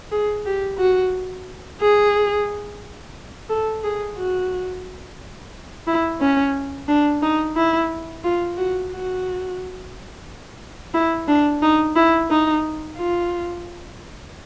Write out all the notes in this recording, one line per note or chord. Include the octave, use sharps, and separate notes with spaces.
G#4
G4
F#4
G#4
A4
G#4
F#4
E4
C#4
D4
D#4
E4
F4
F#4
F#4
E4
D4
D#4
E4
D#4
F4